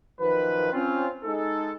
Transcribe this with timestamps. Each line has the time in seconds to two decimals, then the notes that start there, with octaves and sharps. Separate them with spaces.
0.20 F#2 D#3 F3 B4
0.72 C4 C#4 F4
1.24 G#3 D#4 A4